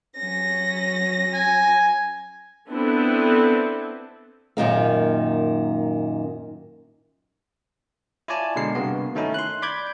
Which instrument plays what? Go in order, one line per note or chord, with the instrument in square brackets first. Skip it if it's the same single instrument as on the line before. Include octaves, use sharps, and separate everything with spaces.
[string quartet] F#3 C#4 A#6
[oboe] G#5
[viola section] B3 C4 D4 E4 A4 B4
[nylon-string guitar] F#2 A#2 D#3 A#3
[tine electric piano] E4 F4 C#5 D5 G#5 A5
B2 D3 G#3 A#4 C7
G2 C3 A#3 B3 F#4
D#3 A3 C#4 D#4 E4
C6 F#6
D5 B5 D6 G6 G#6